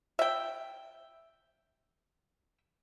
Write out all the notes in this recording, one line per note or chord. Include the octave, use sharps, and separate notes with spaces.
E5 G5